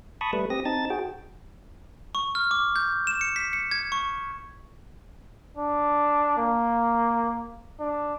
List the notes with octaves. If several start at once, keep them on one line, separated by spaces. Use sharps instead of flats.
A5 B5 C#6 D#6
G3 A3 B4
C4 G4 D#6 A#6
C4 D#4 A5 A6
F#4 G#4 G5
C#6
F6
D6
G6
E7
C#7
B6
C#7
G#6
C#6
D4
A#3
D4